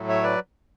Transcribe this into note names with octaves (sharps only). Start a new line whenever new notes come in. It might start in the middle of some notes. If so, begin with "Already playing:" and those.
Already playing: A2 F#3 A3
C#5 E5
B4 D5